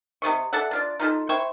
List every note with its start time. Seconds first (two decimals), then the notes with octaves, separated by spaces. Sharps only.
0.22 C3 F4 D#5 C#6
0.53 A4 D5 E5 F#5
0.71 D4 F4 D5
1.00 D#4 F4 G4 A4
1.29 E4 C5 G5 C#6